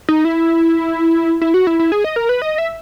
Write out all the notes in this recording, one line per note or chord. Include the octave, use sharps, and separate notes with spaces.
D#4
E4
E4
F#4
E4
E4
G#4
D#5
A#4
B4
D#5
E5